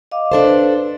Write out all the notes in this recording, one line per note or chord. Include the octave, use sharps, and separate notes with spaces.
D#5 F5 D6
D4 A4 C5
B4